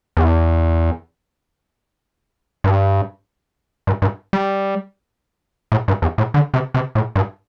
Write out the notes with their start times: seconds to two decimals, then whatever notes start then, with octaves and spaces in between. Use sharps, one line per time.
0.17 E2
2.64 G2
3.87 G2
4.02 G2
4.33 G3
5.72 A2
5.88 G2
6.02 E2
6.18 A2
6.34 D3
6.54 C3
6.74 C3
6.95 A2
7.16 G2